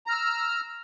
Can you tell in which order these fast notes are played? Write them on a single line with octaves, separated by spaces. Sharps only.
A#5 F6 E6